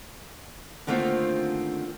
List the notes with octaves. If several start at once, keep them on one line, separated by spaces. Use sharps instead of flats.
D3 D#3 A3 A#3 C4 F4